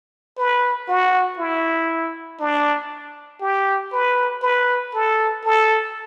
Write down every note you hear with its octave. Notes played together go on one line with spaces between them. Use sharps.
B4
F#4
E4
D4
G4
B4
B4
A4
A4